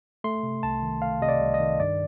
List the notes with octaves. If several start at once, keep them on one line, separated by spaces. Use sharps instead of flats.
A3 C6
C3
C2 A5
D#3
A3 F5
C3 D#5
D5
C2
D#5
D#3
G2 D5